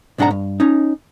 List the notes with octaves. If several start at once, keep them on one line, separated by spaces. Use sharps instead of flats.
B1 G#2 D4 D#5 F#5 A#5
G2
C#4 D#4